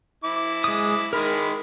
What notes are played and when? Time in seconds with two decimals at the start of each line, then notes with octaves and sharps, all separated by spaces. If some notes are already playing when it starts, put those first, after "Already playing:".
0.24 E4 D6
0.64 G#3 D#6
1.13 D#3 G#3 A#4 B5